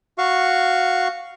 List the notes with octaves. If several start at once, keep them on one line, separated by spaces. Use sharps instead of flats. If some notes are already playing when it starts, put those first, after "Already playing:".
F#4 F5 C#6